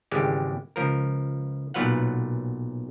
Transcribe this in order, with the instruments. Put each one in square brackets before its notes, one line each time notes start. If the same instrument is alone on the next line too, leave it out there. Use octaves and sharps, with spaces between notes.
[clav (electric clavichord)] G#1 C#3 E3 G3 G#3 G4
C#2 F3 A#4
B1 A#2 F#3 B4 F5 F#5